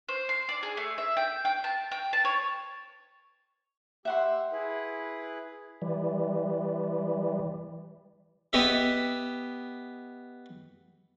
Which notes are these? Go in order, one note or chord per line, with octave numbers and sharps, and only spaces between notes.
C5
C6
D5
G#4
A3
E5
G5
G5
A5
G5
A5
C#5
G4 E5 F#5 C6 E6
E4 G#4 B4
E3 G3
B3 G4 D#5 E5